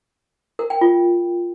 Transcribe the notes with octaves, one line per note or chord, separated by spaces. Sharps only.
A#4
G5
F4